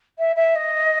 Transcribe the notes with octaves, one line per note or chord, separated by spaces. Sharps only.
E5
E5
D#5